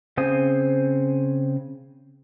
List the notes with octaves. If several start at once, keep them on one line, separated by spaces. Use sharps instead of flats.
C#3 C4 C5 G#5 D#6